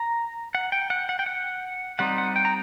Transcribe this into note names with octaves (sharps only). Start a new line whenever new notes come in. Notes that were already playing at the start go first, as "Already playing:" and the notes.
Already playing: A#5
F#5
G5
F#5
F#5
G5
F#5
G3 C4 D#4 F#5
F#5
G5
A#5